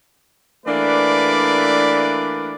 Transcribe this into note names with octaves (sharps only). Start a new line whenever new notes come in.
E3 A3 A#3 D4 B4 D5